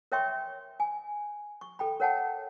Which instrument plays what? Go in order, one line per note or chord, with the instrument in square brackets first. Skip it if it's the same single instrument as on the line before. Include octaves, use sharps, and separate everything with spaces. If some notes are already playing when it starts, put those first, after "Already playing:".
[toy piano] A#4 C#5 E5 G5 C6 C#6
G#5
C#6
A4 G5 B5
A#4 C#5 F#5 G5 A5